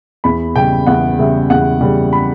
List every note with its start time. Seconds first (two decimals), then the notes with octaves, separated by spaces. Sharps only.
0.24 E2 B5
0.55 C#3 G3 G5
0.87 E2 F#5
1.19 C#3 G3 E5
1.50 E2 F#5
1.81 C#3 G3
2.13 B5